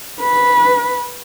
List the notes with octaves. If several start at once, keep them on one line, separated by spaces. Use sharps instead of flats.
B4